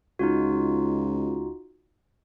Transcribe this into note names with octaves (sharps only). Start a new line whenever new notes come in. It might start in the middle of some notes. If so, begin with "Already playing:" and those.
C#2 D#4 F4 F#4